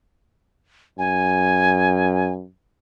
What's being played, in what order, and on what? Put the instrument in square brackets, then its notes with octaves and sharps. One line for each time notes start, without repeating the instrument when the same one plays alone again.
[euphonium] F#2 [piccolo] G#5